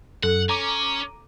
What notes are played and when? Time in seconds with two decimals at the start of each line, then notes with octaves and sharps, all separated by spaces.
0.23 F#2 A4 F#5
0.49 C#4 A#5 D6